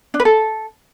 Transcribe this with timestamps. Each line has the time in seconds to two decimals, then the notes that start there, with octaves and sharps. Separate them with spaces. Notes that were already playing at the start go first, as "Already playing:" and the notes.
0.14 D4
0.20 B4
0.25 A4